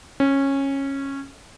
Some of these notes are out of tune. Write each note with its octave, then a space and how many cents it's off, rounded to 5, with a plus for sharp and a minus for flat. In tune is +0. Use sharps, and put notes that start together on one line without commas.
C#4 -15